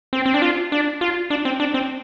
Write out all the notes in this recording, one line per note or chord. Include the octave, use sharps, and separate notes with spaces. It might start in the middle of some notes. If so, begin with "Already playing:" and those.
C4
C4
D4
F4
D4
F4
D4
C4
D4
C4